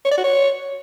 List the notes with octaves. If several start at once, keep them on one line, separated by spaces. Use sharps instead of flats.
C#5
D5
F#4
C#5